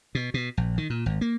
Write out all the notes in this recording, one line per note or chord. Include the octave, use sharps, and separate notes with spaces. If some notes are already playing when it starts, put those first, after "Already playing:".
B2
B2
A#1
D#3
A#2
G#1
A#3